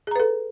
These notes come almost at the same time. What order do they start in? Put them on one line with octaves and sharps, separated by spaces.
G#4 A#5 B4 A4